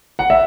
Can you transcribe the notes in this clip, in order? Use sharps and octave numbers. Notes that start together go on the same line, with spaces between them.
F#5
E5